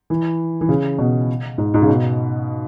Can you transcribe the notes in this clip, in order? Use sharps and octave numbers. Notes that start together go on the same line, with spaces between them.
E3
E3
C#3
B2
G#2
G#2
C#3
B2